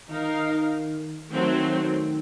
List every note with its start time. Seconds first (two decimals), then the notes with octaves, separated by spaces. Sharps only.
0.10 D#3 D#4 A#4 F5
1.32 D#3 F#3 A3 C4